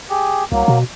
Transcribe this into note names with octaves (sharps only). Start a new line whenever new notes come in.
G4 G#4
C2 F#3 A#3
B2